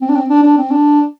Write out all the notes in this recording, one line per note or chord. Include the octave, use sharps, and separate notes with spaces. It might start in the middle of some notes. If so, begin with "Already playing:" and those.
C4
D4
C4
D4
D4
C4
D4